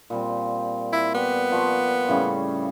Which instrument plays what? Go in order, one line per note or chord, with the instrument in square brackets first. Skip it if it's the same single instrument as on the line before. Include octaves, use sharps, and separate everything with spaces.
[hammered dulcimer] A#2 G3 C4
[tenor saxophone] E4
[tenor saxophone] B3 [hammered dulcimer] G4
[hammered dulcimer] F3 C#6
A2 C#3 G3